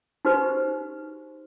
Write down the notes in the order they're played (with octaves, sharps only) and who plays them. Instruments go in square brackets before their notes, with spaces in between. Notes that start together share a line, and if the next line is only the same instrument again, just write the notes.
[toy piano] D#4 F#4 G4 B4 C5